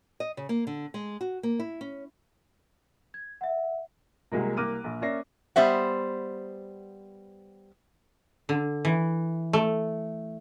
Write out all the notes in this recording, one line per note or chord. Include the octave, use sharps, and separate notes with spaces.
D#5
C#3
A#3
D3
G#3
F#4
A#3
E4
C#4
G#6
E5 F#5
C2 F#3 G#3 A#3
C2 A#3 D6 F6 F#6 D#7
A#1
A#3 C#4 D5 E5 A#6 C7
G3 B3 C5 E5 F#5
D3
E3
A3